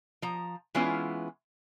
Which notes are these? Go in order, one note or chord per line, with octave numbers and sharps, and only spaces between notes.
F3 A#5
E3 G#3 B3 C#4 E4 F4